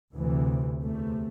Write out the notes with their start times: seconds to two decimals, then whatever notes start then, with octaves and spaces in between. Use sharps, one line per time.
0.15 D2 C3 E3
0.83 E2 C3 A3